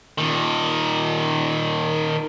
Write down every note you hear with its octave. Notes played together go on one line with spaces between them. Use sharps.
A#2 D#3